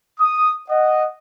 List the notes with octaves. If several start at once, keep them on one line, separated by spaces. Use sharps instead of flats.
D#6
D#5 F#5